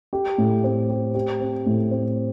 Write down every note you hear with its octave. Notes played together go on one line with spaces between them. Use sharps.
G4
A2
C4
G4
G4
C4
A2
C4